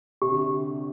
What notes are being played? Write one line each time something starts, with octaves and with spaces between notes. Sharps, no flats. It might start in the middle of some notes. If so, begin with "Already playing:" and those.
C3 G4
D3